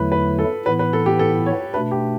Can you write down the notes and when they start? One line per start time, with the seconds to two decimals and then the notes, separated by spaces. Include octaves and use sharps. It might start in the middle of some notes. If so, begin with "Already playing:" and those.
Already playing: E2 D3 F#3 A3 E4 B4
0.12 B4
0.39 A4
0.66 A2 E3 B3 E4 B4
0.79 B4
0.93 A4
1.06 G4
1.19 A4
1.46 C#5
1.74 B2 A3 D4 B4
1.91 G4